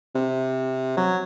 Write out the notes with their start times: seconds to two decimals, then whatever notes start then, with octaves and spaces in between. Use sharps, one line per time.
0.15 C3
0.97 F#3